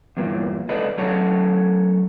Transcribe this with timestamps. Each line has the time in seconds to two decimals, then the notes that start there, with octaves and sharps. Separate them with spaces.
0.17 E2 G2 A#2
0.69 C#2 A4 B4 D5 D#5
0.98 F#3 A3 C#4 F#4 A4 C#5